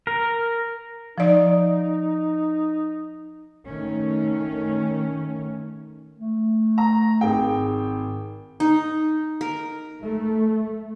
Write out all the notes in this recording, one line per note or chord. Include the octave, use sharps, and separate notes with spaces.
A#4
F3 D#4 D5
D#3 A3 C#4
A3
A#5
G#1 G#4 G5
D#4
A#4
A3